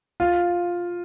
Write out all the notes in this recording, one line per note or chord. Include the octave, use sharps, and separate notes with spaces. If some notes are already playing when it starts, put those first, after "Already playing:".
F4